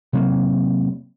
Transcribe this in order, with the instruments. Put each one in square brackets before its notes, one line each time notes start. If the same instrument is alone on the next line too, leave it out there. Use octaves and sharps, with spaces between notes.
[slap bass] C3 F#3 A#3